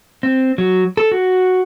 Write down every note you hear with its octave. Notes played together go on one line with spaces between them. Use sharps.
C4
F#3
A4
F#4